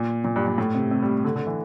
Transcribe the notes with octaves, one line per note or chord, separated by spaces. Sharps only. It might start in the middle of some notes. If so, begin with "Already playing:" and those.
Already playing: A#2
A#2
G2
G2
A2
C3
C3
G3
D3
D3
E3